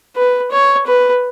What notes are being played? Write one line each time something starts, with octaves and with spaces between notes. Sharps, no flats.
B4
C#5
B4